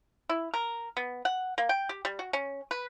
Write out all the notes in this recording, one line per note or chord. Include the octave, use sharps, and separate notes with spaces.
E4
A#4
B3
F#5
A#3
G5
G4
G3
F#4
C#4
B4